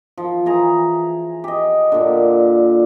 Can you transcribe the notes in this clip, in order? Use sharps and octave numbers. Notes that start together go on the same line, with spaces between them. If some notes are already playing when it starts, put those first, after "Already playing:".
F3
E3 G#4 A#5
G4 D#5
A#2 D3